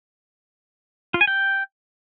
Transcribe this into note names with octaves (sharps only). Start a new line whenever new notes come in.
F4
G#5
G5